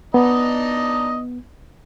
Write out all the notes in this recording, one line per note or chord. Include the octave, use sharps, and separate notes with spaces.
B3 D4 D#4 D#5